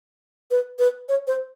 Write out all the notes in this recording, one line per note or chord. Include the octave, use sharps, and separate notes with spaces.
B4
B4
C#5
C5